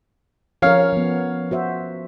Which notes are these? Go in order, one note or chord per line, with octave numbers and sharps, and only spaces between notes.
F3 C#4 A#4 C#5 F5
F3 B3
F#4 C5 E5